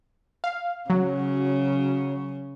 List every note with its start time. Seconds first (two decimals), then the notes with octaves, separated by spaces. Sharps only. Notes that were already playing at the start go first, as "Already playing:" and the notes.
0.44 F5
0.90 C#3 F#3